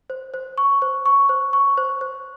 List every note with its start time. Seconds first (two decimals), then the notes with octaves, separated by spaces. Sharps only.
0.10 C5
0.34 C5
0.58 C#6
0.82 C5
1.06 C#6
1.29 C5
1.53 C#6
1.78 C5
2.01 C5